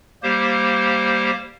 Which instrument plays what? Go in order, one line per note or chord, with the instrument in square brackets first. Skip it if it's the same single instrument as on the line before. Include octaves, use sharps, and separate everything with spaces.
[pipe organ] G3 A#3 G4 C5